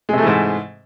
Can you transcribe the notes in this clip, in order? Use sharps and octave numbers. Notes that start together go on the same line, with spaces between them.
G#2 C3 E3 G#3 A3